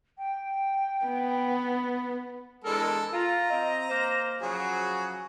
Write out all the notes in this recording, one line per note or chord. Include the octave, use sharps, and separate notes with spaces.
G5
B3
E2 G#3 D4 A4 A#4
F4 A#5
C4 D#5
A#3 C5
C#3 F3 F#3 F#4 G#4